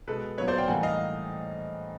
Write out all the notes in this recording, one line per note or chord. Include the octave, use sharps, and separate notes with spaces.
B2 G#3 B3 A4 B4
A#2 F#3 B3 B4 C#5
C5 D5
F5 G5
A2 E3 G3 A#3 F#5 G#5
D#5 F5